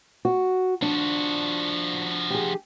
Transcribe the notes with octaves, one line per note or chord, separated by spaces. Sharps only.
F#4
F3 D4 F#4
G4 G#4